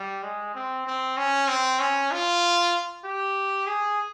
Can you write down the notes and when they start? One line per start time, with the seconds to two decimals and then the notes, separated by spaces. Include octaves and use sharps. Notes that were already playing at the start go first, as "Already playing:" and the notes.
Already playing: G3
0.23 G#3
0.55 C4
0.87 C4
1.17 C#4
1.48 C4
1.80 C#4
2.12 F4
3.05 G4
3.67 G#4